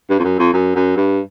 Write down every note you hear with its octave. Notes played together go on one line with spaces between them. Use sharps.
G2
F2
F#2
F2
F#2
F#2
G2